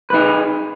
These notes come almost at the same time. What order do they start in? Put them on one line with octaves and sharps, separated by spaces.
B4 D#4 G#4